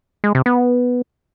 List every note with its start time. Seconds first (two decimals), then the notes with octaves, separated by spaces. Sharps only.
0.24 G#3
0.35 C3
0.46 B3